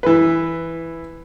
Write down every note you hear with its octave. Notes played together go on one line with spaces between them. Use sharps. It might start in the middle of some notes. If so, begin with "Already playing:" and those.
E3 B4